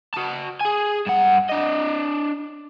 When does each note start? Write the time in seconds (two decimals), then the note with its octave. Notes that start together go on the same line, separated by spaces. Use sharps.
0.14 F#4 A5
0.61 G#4 G#5
1.07 G2 F#5
1.49 D4 D#5